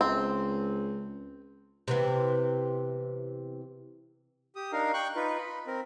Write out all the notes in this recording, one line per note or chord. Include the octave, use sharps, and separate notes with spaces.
C#2 C4
C3 E3 B3
G4 D#6
D4 D#4 A#4 F5
G5 C#6 F#6
D#4 F4 B4
D#5 B5
C4 A#4